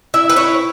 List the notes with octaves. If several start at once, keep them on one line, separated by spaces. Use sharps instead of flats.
E4 E5
B4
E4 C#5